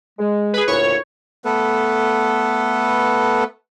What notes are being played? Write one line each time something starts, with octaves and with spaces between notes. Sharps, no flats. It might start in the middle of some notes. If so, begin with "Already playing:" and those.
G#3
G#4 B4
D2 A#2 E4 C#5
A3 B3 A4 B4